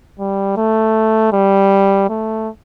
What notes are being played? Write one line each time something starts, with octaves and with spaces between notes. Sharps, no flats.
G3
A3
G3
A3